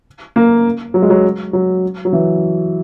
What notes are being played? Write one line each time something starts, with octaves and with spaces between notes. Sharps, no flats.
A#3
F#3
G#3
F#3
F#3
F#3
E3